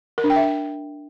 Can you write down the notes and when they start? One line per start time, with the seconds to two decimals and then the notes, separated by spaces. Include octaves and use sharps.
0.18 A#4
0.24 D4
0.30 G5
0.36 E5